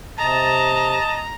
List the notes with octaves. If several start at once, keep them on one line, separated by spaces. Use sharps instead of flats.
C3 D#5 A5 A#5